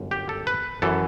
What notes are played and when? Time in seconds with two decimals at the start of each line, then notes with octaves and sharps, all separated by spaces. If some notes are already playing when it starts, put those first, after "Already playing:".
Already playing: G1 F#2
0.11 G4
0.29 A4
0.47 B4
0.82 F#2 E3 A4